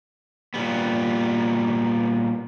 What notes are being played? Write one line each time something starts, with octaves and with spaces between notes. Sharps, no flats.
A#2 G3 B3